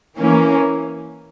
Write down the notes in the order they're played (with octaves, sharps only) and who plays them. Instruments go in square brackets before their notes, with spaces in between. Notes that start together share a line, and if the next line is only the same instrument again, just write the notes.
[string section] E3 A#3 C#4